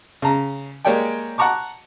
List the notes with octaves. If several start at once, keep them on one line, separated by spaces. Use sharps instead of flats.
C#3 A#5
G#3 A#3 G4 C#5 D5 G5
F#5 A5 A#5 C#6 D6